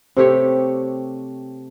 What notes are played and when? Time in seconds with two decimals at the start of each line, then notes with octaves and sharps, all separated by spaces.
0.17 C3 A3 G4 C#5